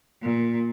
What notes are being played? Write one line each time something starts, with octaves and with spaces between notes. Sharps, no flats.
A#2